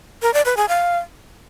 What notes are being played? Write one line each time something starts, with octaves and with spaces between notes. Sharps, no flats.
A#4
D5
B4
G#4
F5